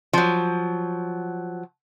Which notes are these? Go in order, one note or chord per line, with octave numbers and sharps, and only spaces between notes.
F3 F#3